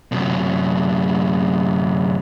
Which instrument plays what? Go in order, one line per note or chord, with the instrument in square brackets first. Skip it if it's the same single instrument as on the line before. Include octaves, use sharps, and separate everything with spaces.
[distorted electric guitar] F#2 C3